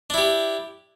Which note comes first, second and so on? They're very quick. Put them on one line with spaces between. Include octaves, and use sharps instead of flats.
D4 E4 G4